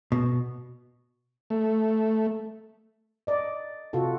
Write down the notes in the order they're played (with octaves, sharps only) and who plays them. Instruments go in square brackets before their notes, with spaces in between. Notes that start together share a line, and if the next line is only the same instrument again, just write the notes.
[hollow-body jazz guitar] B2
[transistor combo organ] A3
[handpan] D5 D#5
C3 F4 F#4 A4